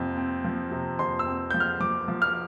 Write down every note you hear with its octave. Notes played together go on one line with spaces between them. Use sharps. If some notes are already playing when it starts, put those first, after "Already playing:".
Already playing: F2 C3 C4
C4
F3
C3
F2 C6
E6
C4
F3 G6
F6
F3 D6
F3
F6